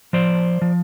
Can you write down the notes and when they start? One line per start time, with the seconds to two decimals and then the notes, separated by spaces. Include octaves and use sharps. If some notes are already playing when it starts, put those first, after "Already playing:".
0.13 F3 C5 D5
0.62 F3